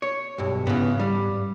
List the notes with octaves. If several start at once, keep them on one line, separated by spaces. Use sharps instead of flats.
C#5
B1 G2
G#2 C#3 E3 B3
G3